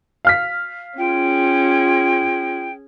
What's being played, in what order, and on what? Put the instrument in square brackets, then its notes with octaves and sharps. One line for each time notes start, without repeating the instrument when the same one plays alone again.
[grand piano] F5 F6 B6
[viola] C#4 G#4 [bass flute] F4 [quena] G5